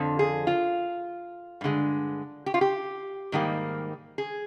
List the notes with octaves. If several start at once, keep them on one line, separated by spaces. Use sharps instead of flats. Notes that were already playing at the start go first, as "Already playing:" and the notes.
Already playing: F2 D3 F3
G#4
F4
G2 D3 G#3
G4
F4
G4
G#2 D#3 G3 A#3
G#4